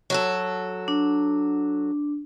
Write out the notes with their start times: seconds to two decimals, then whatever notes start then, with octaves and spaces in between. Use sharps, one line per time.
0.10 F#3 F#4 A4
0.88 D4